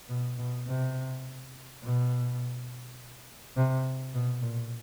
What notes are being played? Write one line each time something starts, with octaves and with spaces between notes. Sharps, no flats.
B2
B2
C3
B2
C3
B2
A#2